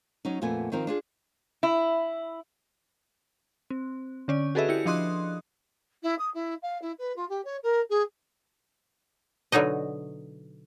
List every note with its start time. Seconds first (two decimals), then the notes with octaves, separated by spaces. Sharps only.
0.25 F#3 C#4 D#4
0.42 F2 A#2 A3 B3 G#5
0.72 D#3 F3 C4 D#4 A#4
0.87 D4 F4 G#4
1.63 E4
3.70 C4
4.28 D3 C#4 D5
4.55 F#4 G#4 A4 B4 D#5 E5
4.69 E4 G4 C#7
4.85 F3 D4 D#5 C6 D#6 F#6
6.03 E4
6.19 D#6
6.34 E4
6.62 F5
6.82 E4
6.99 B4
7.16 F4
7.29 G4
7.45 C#5
7.63 A#4
7.90 G#4
9.52 B2 D3 F#3 D#4 D#5